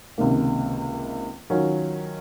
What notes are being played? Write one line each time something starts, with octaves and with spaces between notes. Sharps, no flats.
C#2 C3 D#3 A#3
D#3 F#3 C#4 F4